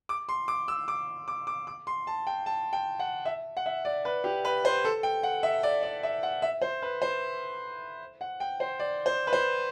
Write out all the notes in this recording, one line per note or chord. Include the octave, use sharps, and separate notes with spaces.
D6
C6
D6
E6
D6
D6
D6
D6
C6
A5
G5
A5
G5
F#5
E5
F#5
E5
D5
B4
G4
B4
C5
A4
G5
F#5
E5
D5
D5
E5
F#5
E5
C5
B4
C5
F#5
G5
C5
D5
C5
B4
C5